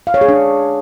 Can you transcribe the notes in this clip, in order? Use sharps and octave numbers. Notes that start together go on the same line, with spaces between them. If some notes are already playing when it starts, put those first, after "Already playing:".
F5
C#5
G#4
D4